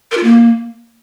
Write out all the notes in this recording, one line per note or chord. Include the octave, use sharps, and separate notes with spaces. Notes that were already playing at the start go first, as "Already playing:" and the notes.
A#4
F4
A#3